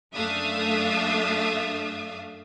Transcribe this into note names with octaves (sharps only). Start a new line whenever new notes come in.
F#2 A3 D4 E5 F5 D#6